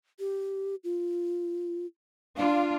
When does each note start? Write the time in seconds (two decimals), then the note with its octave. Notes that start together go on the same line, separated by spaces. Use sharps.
0.19 G4
0.84 F4
2.37 D4 F4 F5